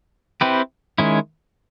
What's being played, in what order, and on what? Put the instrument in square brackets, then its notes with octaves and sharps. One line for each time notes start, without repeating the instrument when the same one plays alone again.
[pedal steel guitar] C4 E4 G4 B4
D#3 G#3 C#4 E4